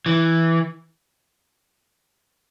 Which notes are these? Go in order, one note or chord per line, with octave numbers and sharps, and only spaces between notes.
E3